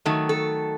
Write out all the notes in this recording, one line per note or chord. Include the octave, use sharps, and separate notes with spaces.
D#3 F#3 A3
A4